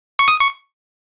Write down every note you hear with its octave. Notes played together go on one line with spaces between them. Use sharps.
C#6
D#6
C#6